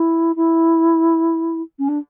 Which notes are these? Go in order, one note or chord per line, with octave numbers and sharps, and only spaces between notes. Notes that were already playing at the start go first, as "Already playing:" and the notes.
Already playing: E4
E4
C#4
D4